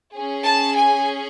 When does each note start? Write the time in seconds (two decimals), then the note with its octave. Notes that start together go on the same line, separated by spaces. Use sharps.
0.14 C#4 G#4
0.44 A5
0.74 G#5